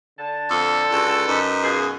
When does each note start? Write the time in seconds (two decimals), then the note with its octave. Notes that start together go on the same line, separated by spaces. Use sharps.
0.18 D3 A5
0.50 F2 A4
0.91 C#2 F#4 E6
1.28 F#2 D#4 B4
1.63 B2 F4 G#4